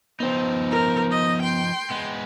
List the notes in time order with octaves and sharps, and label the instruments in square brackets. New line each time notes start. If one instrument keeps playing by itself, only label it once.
[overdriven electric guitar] F3 D#4 [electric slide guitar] B3 C5
[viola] A#4
D#5
G5 C6
[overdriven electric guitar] G#3 B3